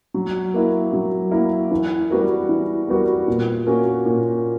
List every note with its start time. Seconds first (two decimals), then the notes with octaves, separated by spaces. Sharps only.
0.14 F#3
0.54 A#3 E4 A#4
0.93 F#3
1.31 A#3 E4 A#4
1.71 E3
2.10 G3 B3 F#4 A#4
2.49 E3
2.88 G3 B3 F#4 A#4
3.28 A#2
3.67 A#3 C#4 F#4 A#4
4.05 A#2